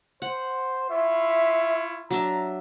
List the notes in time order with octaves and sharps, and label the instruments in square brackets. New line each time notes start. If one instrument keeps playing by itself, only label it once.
[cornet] C5 [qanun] F#5
[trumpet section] E4 F4 C#6 [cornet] E5
[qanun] F#3 D4 E5 [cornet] A#5